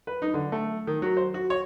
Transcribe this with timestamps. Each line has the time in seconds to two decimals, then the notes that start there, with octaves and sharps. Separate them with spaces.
0.07 B4
0.22 D#4
0.34 D3
0.52 A3
0.87 D#3
1.02 F#3
1.17 C5
1.34 F#4
1.50 C#5